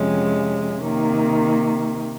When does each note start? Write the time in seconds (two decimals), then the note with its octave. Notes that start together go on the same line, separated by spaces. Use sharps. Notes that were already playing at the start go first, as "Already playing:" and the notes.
Already playing: F2 C3 F3 G#3 C#4
0.81 C3 D#3 A#3